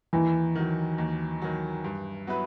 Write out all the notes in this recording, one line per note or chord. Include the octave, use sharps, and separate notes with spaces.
D#2 E3
D#3 F#3
D#2
D#3 F#3
G2
F#3 B3 E4 B4